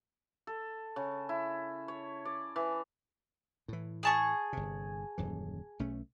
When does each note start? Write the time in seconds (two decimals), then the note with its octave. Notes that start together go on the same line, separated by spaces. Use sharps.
0.47 A4
0.96 C#3
1.29 E4
1.88 C#5
2.25 D5
2.56 E3
3.68 A2 E3
4.03 G#4 A5 C#6
4.53 G1 C3
5.18 D#1 F#2 E3
5.79 B1 A3 C#4